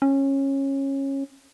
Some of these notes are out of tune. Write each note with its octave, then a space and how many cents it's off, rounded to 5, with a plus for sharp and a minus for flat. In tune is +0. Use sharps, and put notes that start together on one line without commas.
C#4 -20